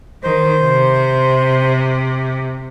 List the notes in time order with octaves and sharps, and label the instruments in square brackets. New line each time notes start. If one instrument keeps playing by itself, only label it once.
[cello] D#3 [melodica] C5
[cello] C3